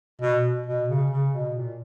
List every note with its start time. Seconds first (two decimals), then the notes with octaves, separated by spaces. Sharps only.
0.21 B2
0.66 B2
0.88 C#3
1.11 C#3
1.33 B2
1.55 A#2